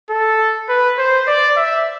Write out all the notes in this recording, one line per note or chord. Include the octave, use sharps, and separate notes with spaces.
A4
B4
C5
D5
E5